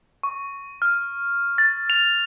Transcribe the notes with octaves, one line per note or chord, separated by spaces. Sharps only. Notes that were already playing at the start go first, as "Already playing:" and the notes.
C#6
F6
A6
F7